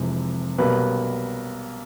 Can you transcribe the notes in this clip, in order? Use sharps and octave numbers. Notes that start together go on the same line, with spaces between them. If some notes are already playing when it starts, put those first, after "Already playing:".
Already playing: F1 F2 C3 E3 G#3
B1 B2 G3 A#3 B4